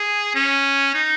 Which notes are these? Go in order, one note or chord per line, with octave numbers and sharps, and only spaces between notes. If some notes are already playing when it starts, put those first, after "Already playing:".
Already playing: G#4
C#4
D#4